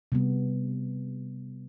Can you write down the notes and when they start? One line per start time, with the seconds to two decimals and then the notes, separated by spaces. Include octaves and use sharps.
0.12 C3 G3 B3